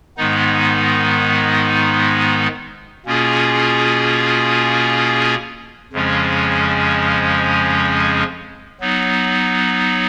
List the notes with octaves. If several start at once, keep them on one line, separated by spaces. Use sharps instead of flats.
G#2 D#3 G#3 B3 D#4
B2 A#3 C#4 F4 G#4
F2 C#3 F3 G#3 C#4
F#3 B3 D#4